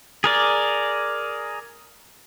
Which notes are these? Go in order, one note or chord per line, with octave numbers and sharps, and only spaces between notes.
G#4 A#4 D5